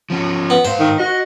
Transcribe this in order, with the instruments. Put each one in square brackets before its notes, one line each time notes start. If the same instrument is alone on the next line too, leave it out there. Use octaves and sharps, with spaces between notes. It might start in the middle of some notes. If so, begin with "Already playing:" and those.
[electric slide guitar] F3 C#4
[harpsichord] B3
[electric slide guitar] G#2 F5 [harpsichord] C5
[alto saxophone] D#3
[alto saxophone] F#4 [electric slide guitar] D#5